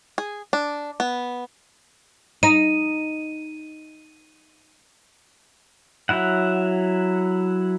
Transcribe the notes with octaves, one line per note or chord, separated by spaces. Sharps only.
G#4
D4
B3
D#4 D#7
F#3 E4 F#5